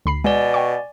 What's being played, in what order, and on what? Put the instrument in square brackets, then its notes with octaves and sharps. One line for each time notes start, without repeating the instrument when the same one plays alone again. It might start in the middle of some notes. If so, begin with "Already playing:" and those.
[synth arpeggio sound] D2 B5 C7
[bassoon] B2 [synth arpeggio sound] G#3 [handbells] D5 G#5
[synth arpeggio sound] G5 C#6